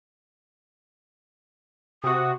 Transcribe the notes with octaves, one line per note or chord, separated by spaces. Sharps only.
C3 F#4 D#6